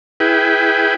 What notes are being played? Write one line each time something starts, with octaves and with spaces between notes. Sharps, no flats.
E4 G#4 B4 G5